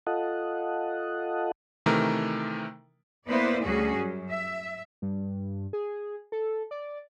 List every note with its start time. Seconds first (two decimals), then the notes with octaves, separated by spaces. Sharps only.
0.07 F4 A4 D#5 F#5
1.86 C3 D#3 E3 A3 A#4
3.27 A#3 B3 E4 B4 C5 D5
3.62 D2 G3 C#4 F#4 G#4
3.98 F#2
4.29 E5
5.02 G2
5.73 G#4
6.32 A4
6.71 D5